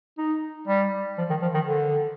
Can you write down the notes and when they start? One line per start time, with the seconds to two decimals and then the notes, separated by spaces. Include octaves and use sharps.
0.18 D#4
0.67 G3
1.18 F3
1.30 D#3
1.42 F3
1.54 D#3
1.67 D3